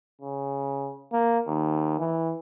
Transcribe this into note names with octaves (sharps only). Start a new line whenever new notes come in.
C#3
A#3
D#2
E3